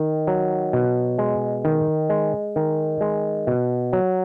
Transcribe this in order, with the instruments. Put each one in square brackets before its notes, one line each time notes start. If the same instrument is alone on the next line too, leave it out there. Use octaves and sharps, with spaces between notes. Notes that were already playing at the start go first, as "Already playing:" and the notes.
Already playing: [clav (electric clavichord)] D#3
F#3
B2
G#3
D#3
G#3
D#3
G#3
B2
F#3